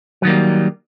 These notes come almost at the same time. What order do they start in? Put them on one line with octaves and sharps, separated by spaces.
F#3 D#3 A#3 G3